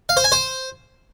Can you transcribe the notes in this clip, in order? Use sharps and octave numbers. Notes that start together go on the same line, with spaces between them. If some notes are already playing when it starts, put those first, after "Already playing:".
F5
C5
G#5
C5